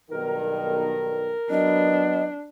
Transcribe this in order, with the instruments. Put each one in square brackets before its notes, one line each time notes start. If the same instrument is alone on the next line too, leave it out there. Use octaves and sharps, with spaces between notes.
[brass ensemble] B1 G2 D#3 [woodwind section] A#4
[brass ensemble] F#3 B3 [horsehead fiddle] D4 [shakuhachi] D#5